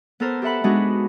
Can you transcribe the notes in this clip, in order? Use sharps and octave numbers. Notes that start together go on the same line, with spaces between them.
B3 A4 A#4 C5
G4 A4 E5 F#5 B5
G#3 B3 D4 D#4 F#4